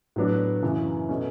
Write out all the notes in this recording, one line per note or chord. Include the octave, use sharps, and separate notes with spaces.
A2 F#3 B3 D4
F#2 C#3 E3
B2 A3 C#4